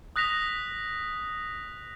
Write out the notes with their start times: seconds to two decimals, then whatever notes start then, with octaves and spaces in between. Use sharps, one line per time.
0.16 D#6 F#6 A#6 B6 F7